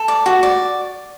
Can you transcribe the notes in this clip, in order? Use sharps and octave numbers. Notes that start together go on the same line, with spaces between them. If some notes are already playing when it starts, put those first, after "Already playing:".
Already playing: A4
D5
F#4
D5